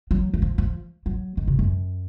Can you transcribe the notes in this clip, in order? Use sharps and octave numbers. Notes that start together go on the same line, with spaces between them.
F#3
D#3
F3
F3
F#3
D#3
C3
F#2